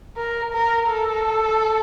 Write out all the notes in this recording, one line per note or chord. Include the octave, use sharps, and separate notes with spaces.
A#4
A#4
A4